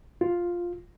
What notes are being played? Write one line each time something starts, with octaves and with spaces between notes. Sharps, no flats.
F4